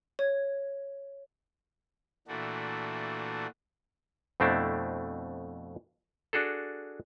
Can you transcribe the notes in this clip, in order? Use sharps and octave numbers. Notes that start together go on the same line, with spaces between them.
C#5 G#6
A#2 E3 A3 D4 F#4
F2 B2 A3 C4 D4 E4
D4 F#4 G#4 A4